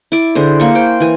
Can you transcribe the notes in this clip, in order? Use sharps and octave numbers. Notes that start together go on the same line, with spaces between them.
E4 D5
D3 G#4 C5
A#3 C#6
C5 G5
E3 G#5